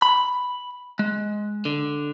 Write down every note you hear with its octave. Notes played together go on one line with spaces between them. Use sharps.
B5
G#3
D3